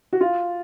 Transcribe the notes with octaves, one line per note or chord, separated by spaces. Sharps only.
F#4
F4